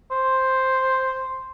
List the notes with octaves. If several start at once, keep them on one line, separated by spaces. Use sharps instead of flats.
C5